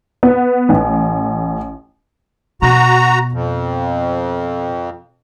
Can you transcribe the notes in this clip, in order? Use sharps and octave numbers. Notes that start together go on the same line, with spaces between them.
B3
A1
B2 F#4 A#5
F2